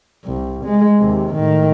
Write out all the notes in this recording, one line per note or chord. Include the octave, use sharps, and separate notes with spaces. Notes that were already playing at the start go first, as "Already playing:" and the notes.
C2
G#3
D#2 C3
A2 D#3